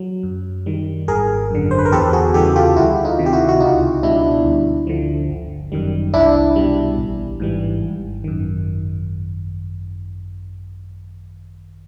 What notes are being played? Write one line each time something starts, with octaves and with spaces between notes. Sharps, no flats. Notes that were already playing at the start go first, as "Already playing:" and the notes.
Already playing: F#3
F#2
D#3 G3
G#1 G#4 A#4
F#2 D3
C5
B4
A#4
E2 G4 A4
F#4 G#4
C#3 E3 G3 G4 A4
F4 G4
D2 E4 F#4
D#4 F4
C3 D#3
G4
E4 F#4
F#4
C#2 D#4 F4
B2 G3 D4 E4
D2
D3 F3
G1
F#2 D#3 G3
C2 D4 E4
B2 G3
A1
G#2 E3 G3
G#1
F#2 D#3